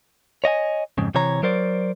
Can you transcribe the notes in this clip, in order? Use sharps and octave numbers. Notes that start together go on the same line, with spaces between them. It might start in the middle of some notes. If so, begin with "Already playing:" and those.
C#5 D#5 E5 G#5
F2 G#2 C#3
C3 E3 C#5 A#5
F#3 A#4 C5 D5